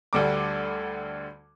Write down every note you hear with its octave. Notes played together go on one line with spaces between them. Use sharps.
D2 D3 G3 D6